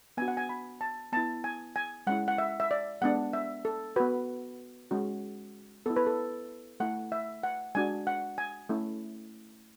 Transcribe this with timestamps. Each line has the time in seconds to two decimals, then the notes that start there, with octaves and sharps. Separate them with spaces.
0.17 B3 D4 F#4 G#5
0.28 F#5
0.37 G#5
0.49 B5
0.81 A5
1.12 B3 E4 A5
1.44 G#5
1.76 G#5
2.07 G#3 C#4 E4 F#5
2.28 F#5
2.38 E5
2.60 E5
2.71 D5
3.01 G#3 B3 D4 F#5
3.33 E5
3.65 A4
3.96 B3 F#4 B4
4.91 G#3 C#4 F#4
5.86 B3 E4 A4
5.96 B4
6.07 A4
6.80 A3 E4 F#5
7.12 E5
7.43 F#5
7.75 G#3 D4 F#4 G#5
8.07 F#5
8.38 G#5
8.69 A3 C#4 E4